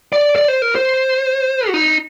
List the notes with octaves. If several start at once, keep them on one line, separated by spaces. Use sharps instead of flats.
D5
D5
C5
A#4
C5
F#4
D#4